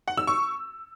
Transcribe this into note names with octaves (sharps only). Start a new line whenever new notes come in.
F#5
E6
C#6